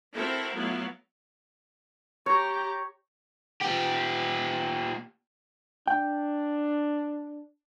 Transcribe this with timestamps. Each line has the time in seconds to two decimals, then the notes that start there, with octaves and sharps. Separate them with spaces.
0.15 C4 E4 F#4 A4 A#4
0.56 F#3 A3 B3 E4 F4
2.26 G4 C#5 A#5
3.62 A#2 G4
5.88 D4 G5